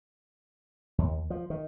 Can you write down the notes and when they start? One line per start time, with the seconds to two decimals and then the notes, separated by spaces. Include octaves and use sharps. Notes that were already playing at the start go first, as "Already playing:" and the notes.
0.98 D#2
1.30 F3
1.50 D#3